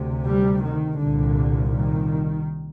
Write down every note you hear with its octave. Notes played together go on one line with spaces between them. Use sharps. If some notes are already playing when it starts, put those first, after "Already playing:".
Already playing: D2 C3
G3
D#3
C2 A#2 D3
D#3